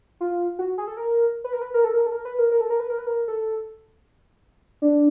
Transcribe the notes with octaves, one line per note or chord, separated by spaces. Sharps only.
F4
F#4
G#4
A4
A#4
B4
A#4
B4
A#4
A4
A#4
A4
A#4
B4
A#4
A#4
A4
A#4
B4
A#4
B4
A#4
A4
D4